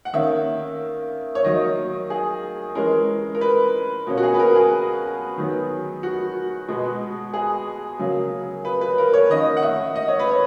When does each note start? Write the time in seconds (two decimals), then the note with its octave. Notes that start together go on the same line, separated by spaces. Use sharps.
0.05 F#5
0.13 D#3 A#3 C#4 E5
1.35 C#5
1.44 D#3 F#3 A#3 D#5
2.10 G#4
2.75 E3 G#3 C#4 A#4
3.35 A#4
3.41 B4
4.07 B2 A#3 C#4
4.17 F#4
4.23 G#4
4.34 B4
4.39 A#4
4.55 G#4
5.37 D#3 F#3 B3
6.03 F#4
6.68 B2 G#3 B3
7.34 G#4
7.99 C#3 F#3 A#3
8.65 B4
8.81 B4
8.98 A#4
9.13 C#5
9.30 D#3 A#3 C#4 D#5
9.57 F#5
9.63 E5
9.96 D#5
10.08 C#5
10.19 B4
10.31 C#5